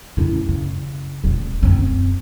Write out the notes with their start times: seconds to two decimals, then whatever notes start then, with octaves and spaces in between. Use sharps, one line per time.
0.17 F#2 E4
0.48 C#3
1.24 D#1
1.63 F#2 C4